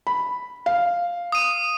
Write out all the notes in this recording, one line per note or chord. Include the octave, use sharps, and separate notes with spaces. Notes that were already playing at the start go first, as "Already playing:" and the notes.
B5
F5
D#6 D#7